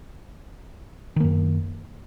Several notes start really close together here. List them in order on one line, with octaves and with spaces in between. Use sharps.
D#3 A#3 F#2